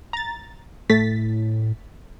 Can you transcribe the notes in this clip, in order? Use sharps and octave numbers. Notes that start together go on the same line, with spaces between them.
A#5 A6
A2 A3 A6 B6